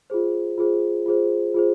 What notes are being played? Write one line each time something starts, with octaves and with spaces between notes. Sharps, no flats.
F4 G#4 C5
F4 G#4 C5
F4 G#4 C5
F4 G#4 C5